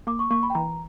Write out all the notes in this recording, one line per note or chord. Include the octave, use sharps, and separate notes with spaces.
A#3 D6
C#6
A#3 C#6
B5
G5
E3 A#5